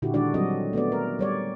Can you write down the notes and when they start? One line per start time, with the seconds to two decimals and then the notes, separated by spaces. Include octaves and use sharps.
0.02 A#2 D3 E4 F#4 G4
0.14 D#3 G#3 D4 D#4 F#4 D5
0.34 F#3 G3 C4 F#4 A4 D#5
0.73 A3 B3 F#4 D5
0.92 A#4
1.19 G3 C#5 D5